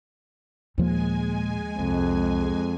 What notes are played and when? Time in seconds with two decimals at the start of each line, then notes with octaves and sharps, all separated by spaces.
0.78 D#2 A#2 F3 G#3 A#3 G#5
1.79 C2 F2